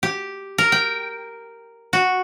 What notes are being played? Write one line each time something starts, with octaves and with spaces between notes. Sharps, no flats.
G4
A#4
G5
F#4